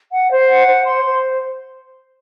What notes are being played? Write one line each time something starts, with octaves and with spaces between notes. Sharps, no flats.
F#5
C5
F#5
C5
C6
C5